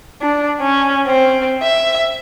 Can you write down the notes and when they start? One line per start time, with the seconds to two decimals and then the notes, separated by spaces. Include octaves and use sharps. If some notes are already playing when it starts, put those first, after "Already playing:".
0.21 D4
0.61 C#4
1.07 C4
1.63 E5